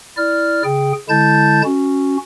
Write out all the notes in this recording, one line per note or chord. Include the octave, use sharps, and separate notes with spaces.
E4 D5 F6
C#3 G#4 G5
D3 G#3 E4 A5 G6 A6
C#4 F#4